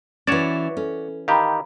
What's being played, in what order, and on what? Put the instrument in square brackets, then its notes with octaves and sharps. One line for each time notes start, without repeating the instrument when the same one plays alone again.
[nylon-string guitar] E3 C#4 [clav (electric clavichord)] F#4 C#5 D5 [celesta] A6 E7
[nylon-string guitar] C#4 [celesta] A4
[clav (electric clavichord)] D#3 G4 [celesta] F5 A#5 B5